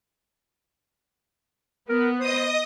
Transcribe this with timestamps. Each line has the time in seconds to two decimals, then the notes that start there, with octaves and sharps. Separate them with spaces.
1.89 B3 A#4
2.20 C5 D#5 D#6